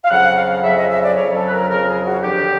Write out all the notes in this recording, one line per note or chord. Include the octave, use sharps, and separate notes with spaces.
F5
F2 C#3 F#3 F#5
F5
F2 C#3 F#3 E5
D#5
E5
D5
F2 C#3 F#3 C#5
A4
B4
A#4
F2 C#3 F#3 A#4
G#4
F#4
D#2 D3 F3 G4